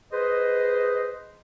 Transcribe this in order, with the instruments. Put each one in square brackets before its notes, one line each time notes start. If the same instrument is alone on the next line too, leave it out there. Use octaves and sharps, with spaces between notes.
[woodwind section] G#4 B4 C5 D#5